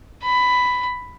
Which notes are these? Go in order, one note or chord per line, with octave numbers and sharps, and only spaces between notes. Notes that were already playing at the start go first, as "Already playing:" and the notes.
B5